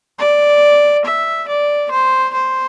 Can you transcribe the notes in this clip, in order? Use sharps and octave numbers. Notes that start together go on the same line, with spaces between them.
D5
E5
D5
C5
C5